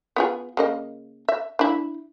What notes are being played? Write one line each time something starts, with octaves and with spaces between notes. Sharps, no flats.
B3 F4 G#4
C#3 A#3 D#5
E5
D4 E4